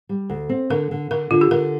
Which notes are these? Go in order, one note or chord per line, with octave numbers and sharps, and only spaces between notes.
G3
D2
C4
D3 A#4
D3
D3 A#4
D3 F4
G4
D3 A#4